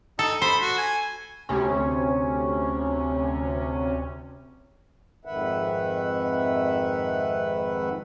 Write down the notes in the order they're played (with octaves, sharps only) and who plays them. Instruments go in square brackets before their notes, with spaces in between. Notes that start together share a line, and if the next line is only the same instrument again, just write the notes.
[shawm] D#4 [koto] A4
[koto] C5 [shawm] B5
[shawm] F#4
G#5
[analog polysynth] D2 C3 C#4
[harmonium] F2 G#2 D#3 B4 E5 F#5